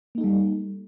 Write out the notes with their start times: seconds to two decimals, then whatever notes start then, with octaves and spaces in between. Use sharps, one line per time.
0.15 A#3
0.18 D#4
0.21 A4
0.24 G3